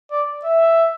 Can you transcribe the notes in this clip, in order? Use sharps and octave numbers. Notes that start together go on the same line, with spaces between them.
D5
E5